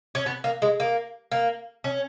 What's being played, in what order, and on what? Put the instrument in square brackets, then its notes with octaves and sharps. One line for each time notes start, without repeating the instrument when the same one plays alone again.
[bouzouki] C#4
B3
A#3
G#3
A#3
A#3
C#4